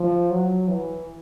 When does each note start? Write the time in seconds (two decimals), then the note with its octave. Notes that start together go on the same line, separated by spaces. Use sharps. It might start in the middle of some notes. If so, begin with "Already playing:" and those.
Already playing: F3
0.31 F#3
0.68 E3